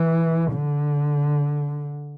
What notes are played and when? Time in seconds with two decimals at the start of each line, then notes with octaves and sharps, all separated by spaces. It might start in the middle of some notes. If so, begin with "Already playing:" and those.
Already playing: E3
0.53 D3